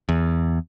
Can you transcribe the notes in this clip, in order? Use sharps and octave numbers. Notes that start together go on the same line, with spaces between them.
E2